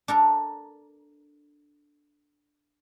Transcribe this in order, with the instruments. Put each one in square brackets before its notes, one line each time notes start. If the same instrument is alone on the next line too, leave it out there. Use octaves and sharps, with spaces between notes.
[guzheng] D4 A4 A#4